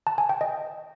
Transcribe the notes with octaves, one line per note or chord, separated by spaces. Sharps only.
A5
G#5
G5
D#5